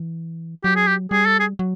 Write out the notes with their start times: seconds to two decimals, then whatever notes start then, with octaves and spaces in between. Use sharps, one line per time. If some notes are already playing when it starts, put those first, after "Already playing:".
Already playing: E3
0.64 F#3 G4
0.76 G#4
0.87 G4
1.11 G3 G#4
1.26 A4
1.40 G#4
1.59 F#3